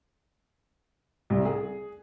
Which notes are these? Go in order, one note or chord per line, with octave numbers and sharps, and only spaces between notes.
C2
G#4